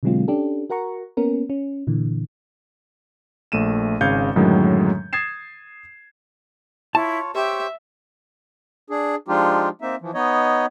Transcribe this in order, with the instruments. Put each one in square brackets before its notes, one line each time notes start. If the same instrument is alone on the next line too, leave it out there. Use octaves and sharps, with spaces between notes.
[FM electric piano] B2 D3 F#3 G#3 C4 F4
C#4 D4 G4 A4
F#4 A#4 F#5 A#5 C#6
A#3 B3 C#4 A#4
C#4
A#2 D3 E3
[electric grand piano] A#1 A3 D#7 E7
G#1 C#3 F5 G6 G#6 C#7
F#2 A2 D3 D#3 F#3 G#3
D#6 G#6 A6 C7 E7
[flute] E4 [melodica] F4 C#5 [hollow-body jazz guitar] A5
[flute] G4 [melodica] C5 C#5 [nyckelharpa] E5
[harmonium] D4 G#4
F3 G#3 D4 D#4 F4 G4
A#3 C4 D#4 E5
E3 F3
B3 D#4 C#5 D#5